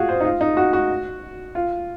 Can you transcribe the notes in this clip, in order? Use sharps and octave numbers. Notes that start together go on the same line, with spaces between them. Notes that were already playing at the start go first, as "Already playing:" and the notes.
Already playing: F4 F#4 G#4
C5
D#4
F4
D#4
F#4
F#4
F4